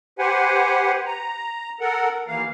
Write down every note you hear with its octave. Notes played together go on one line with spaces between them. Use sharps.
G4 B4 C5 F#5 G#5
A#5
A4 A#4 F#5
D#2 E3 A#3 F5